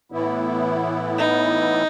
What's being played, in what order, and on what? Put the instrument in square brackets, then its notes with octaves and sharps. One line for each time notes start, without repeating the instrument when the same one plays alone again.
[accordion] A2 E3 B3 E4
[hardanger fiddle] D#4